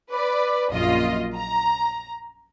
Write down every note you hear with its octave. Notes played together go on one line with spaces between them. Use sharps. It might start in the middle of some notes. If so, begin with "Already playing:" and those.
B4 D5
A#1 F#2 A#3 F4 D#5
A#5